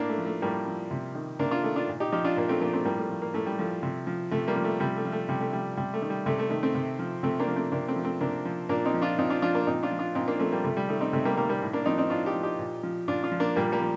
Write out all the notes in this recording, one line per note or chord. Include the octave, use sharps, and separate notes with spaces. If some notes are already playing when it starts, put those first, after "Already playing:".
Already playing: A2 A#3 D4
A3
F3
A3
A2 G3 A#3
F3
C3
D#3
C3 A#3 D4
D4 F4
D#3 A3
D4 F4
A#2
D#4 G4
F3 D#4 G4
D4 F4
A#2 A#3
A3 C4
F3 A#3 D4
A3 C4
A2 G3 A#3
A3
F3
A#3
A2 A3
G3
F3 A3
C3
F3
C3 A3
G3 A#3
F3
A3
C3 G3
A3
F3
A3
C3 G3
A3
F3 G3
C3 G3
A3
D#3
G3
C3 A3
A3
D#3 A3
A3 C4
C3
F3
C3 A3 C4
A#3 D4
F3
A3 C4
C3 A#3 D4
A3 C4
F3
A3 C4
C3 A#3 D4
F3
A#2 A#3 D4
C4 D#4
F3
D4 F4
A#2 C4 D#4
D4 F4
F3 D4 F4
A#3 D4
A#2 C4 D#4
D4 F4
F3
D4 F4
A#2 C4 D#4
A#3 D4
F3 A3 C4
G3 A#3
C3 A3
G3
D#3 A3
C4 D#4
C3 A3
G3 A#3
D#3 G3 A#3
G3 A#3
A2
A#3 D4
F3 C4 D#4
C4 D#4
A2 D4 F4
D#4 G4
F3
D#4 G4
A#2
F3
A#2 D4 F4
D4 F4
F3
A#3 D4
A#2 G3 A#3
G3 A#3
F3